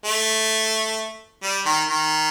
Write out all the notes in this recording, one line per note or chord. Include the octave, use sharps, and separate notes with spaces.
A3
G3
D#3
D#3